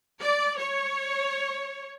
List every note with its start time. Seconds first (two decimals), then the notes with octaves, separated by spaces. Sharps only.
0.21 D5
0.58 C#5